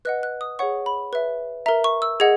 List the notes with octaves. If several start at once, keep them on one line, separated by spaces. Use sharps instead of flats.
B4 D#5 F#5 F#6
F#6
D#6
G#4 C#5 F#5 C#6
B5
B4 E5
A#4 E5 A#5
C#6
E6
G#4 D#5 F#5 G#6